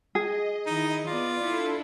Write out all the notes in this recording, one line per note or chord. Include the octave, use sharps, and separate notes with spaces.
G#4 D#5
D#3 D#4 E4
B3 F4 D5
D4 E4 A4